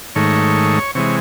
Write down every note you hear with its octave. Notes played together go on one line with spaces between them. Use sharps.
G#2 D#3 A3 C#5
C3 E3 G#3 C#5